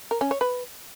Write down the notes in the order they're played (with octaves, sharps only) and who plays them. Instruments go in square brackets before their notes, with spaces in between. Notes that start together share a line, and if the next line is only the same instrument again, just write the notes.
[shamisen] A#4
C#4
C#5
B4